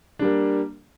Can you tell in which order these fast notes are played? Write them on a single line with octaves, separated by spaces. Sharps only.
D4 G3 A#3